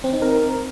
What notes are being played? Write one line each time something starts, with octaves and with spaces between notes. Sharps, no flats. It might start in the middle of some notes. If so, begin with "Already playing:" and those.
C4
D#4
A#4